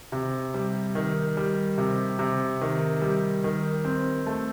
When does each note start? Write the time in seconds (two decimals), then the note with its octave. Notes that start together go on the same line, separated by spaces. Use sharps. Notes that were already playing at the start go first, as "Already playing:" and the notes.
0.12 C3
0.54 G3
0.95 D#3
1.37 G3
1.78 C3
2.19 C3
2.61 D#3
3.02 G3
3.44 D#3
3.85 C4
4.26 A3